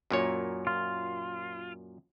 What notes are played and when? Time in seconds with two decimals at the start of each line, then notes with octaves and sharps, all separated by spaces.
0.11 F#2 A#2 C#5
0.67 F4